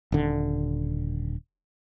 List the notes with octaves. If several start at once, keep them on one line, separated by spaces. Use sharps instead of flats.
D#1 D3